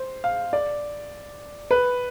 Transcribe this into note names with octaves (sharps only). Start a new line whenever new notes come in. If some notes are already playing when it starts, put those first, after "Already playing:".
Already playing: C5
F5
D5
B4